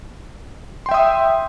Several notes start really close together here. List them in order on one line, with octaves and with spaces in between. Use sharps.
C6 G5 E5 D#6